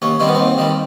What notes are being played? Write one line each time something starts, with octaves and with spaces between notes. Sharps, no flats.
D#2 C#4
D#3 G3 C4
B3
D#2 C4
D#3 G3